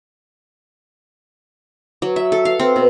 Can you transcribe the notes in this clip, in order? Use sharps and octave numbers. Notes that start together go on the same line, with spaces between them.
F#3
E5
A4
F5
C4
B2